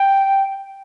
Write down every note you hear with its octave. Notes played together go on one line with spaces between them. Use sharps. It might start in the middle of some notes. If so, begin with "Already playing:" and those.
Already playing: G5